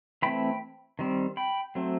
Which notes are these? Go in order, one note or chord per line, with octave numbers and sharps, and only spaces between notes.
E3 A3 C4 G5 B5
D#3 G3 C4
G5 B5
F#3 A3 C4